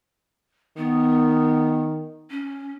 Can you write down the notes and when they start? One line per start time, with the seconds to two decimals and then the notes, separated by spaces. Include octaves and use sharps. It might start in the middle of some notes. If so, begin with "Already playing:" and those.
0.77 D#3 B3
2.30 C#4